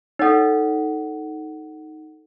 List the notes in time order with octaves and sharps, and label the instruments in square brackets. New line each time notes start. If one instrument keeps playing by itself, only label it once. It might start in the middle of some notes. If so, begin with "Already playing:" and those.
[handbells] D#4 F#5 [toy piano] A4 C#5